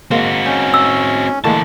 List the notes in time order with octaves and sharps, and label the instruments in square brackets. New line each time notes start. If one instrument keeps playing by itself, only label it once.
[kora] G#3 A#3 F5 [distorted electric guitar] C4 F#4
[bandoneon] C#4 [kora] D#4
[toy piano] E6
[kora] A2 D3 A#3 [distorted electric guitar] E3 A5 [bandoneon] G#3